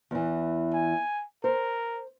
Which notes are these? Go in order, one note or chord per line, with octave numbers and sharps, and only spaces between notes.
E2 E3
G#5
A#4 C5